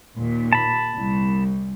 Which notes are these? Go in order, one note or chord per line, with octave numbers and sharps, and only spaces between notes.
D#2 A#2
A5 B5
C2